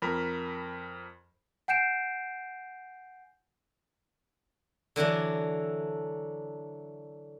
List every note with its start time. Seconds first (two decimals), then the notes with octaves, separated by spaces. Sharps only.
0.02 F2 A#4 B5
1.68 F#5 G#5 G6 C7 D7 E7
4.96 D3 E3 F#3 D4